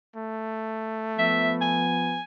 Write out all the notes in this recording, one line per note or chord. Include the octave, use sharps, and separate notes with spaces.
A3
F3 B3 E5
G#5